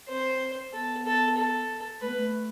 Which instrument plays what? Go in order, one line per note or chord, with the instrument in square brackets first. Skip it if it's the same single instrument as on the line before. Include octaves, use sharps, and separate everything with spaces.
[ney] C4 [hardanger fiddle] C5
[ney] B3 [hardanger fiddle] A4
[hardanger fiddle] A4
A4
[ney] A3 [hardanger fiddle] B4
[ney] B3
A3